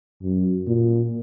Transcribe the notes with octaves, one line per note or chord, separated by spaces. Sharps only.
F#2
A#2